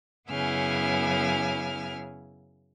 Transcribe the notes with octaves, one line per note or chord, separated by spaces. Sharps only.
F#2 C#3 B3 E4 G#5 F6